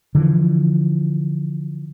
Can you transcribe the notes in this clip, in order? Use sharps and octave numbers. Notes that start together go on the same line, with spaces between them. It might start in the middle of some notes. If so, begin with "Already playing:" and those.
D3 E3 F3